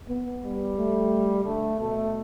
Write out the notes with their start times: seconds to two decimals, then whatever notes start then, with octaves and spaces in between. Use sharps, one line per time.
0.09 B3
0.44 G3
0.78 A3
1.46 D3 A3
1.80 B2 A3